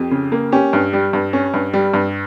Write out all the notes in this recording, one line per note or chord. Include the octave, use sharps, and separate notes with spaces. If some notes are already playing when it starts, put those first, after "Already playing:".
Already playing: F2 G4
C#3
A#3
C#4 G4
G2
G3
G2
C#4
G2
G3
G2